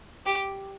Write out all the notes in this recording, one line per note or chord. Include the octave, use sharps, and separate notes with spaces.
G4